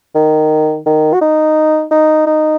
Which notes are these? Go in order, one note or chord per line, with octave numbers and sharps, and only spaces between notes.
D#3
D#3
F#4
D#4
D#4
D#4